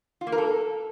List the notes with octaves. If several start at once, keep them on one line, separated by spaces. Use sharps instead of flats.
F4
A#3
A#4
A4